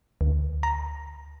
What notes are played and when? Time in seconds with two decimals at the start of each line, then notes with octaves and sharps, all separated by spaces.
0.21 D2
0.63 A#5